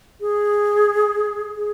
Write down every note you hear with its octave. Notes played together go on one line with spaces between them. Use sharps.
G#4
G#4